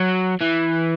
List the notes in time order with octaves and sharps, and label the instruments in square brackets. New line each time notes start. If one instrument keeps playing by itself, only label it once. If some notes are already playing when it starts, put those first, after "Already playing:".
Already playing: [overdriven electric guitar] F#3
E3